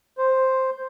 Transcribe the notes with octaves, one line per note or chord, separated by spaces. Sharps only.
C5